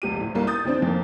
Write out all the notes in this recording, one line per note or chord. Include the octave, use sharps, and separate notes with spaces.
F1 C#2 G4 D#7
D2 A2
G1 C2 A#3
D#6 G6 A6
D#2 D#3 E3 C4 D4
F2 A#3